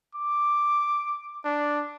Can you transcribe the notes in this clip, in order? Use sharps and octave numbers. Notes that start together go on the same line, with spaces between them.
D6
D4